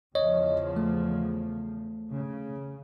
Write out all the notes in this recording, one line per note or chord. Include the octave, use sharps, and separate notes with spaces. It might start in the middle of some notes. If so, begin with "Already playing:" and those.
E2 C#3 F3 C#5 D#5
A3
C#3